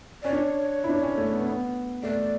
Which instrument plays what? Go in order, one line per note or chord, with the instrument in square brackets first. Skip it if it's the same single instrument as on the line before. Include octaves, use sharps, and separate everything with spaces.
[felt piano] C#4 [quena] D5
[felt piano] D4 [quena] C#5
[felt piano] E4
D4
C#4
A3
B3
B3
[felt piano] A3 [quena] D5